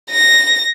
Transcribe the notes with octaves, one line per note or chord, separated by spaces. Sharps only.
A#6